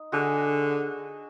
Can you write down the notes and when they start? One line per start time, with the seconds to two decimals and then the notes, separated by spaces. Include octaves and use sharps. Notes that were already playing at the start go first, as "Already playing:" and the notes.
Already playing: D#4
0.12 D3 F#4 G#4